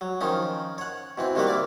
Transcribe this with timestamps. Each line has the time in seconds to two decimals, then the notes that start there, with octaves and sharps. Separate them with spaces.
0.01 F#3
0.21 D#3 F3 C#4 D#4
0.78 C#5 F#5
1.18 B2 E3 C4
1.35 C3 D#3 G3 A#3 F#4 B4
1.47 E4 D5 F5